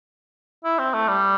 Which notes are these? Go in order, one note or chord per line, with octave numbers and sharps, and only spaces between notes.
E4
C4
A3
G3